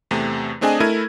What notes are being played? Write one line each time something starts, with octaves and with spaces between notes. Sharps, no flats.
E2 C3 A3
A3 C4 D4 G#4 D#5 G#5
A3 E4 A4 A#4 G#6 D#7